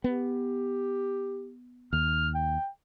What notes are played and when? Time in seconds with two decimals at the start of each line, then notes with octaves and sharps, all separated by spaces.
0.04 B3 G4
1.93 D#2 F6
2.35 G5